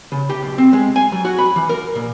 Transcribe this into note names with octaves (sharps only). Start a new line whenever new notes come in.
C#3
G4
B1
C4
G#3
G#5
F#3
F#4
B5
E3
A#4
A#2